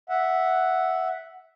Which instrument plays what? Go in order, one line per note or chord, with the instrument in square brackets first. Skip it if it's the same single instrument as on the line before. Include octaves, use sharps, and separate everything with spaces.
[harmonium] E5 F#5